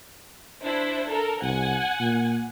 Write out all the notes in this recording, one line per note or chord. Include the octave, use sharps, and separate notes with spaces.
D4 E4 C5
A4 A#4
C2 F#5 G#5
A#2